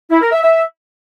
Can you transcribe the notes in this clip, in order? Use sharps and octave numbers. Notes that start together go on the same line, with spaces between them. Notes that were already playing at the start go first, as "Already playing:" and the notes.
E4
A#4
E5
E5